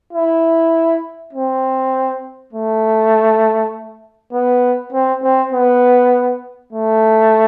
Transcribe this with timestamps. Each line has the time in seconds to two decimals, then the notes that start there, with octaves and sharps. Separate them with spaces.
0.13 E4
1.33 C4
2.53 A3
4.33 B3
4.92 C4
5.23 C4
5.53 B3
6.73 A3